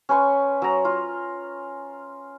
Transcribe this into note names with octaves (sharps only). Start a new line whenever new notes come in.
C#4 B4 C6 C#6
F#3 A#5
F4